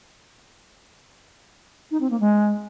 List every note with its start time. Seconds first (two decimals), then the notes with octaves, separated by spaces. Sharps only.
1.91 D#4
2.01 C4
2.10 A#3
2.20 G#3